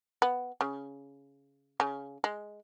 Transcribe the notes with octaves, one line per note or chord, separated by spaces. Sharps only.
B3
C#3
C#3
G#3